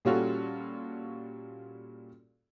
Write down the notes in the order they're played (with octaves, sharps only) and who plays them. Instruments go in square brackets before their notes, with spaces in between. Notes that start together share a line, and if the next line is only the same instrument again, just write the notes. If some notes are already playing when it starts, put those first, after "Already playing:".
[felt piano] A#2 G3 C#4 F4 F#4 A4